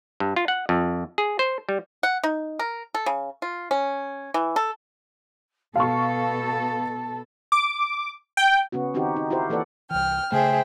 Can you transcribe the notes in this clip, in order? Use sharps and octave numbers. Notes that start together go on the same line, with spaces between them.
G2
F4
F#5
F2
G#4
C5
G3
F#5
D#4
A#4
A4
C#3
F4
C#4
E3
A4
B2 A4 F5 A5 C#6
D6
G5
C#3 B3 C#4 F#4
D#3 C4 D#4 F#4 G4
D#4
E4 F#4 G4 A#4 C5
E3 A#3 A4 B4 D5 F#5
C2 E3 G5 F6
C#3 A3 G#4 C5 E5 G5